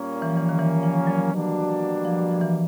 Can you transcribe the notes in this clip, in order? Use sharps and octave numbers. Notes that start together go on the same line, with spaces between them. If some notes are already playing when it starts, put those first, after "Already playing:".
Already playing: A#2 G3 A#3 C#4
E3
F3
E3
D#3
E3
F3
F#3
B2 G3 A#3 D4 F#4
F3
F3
E3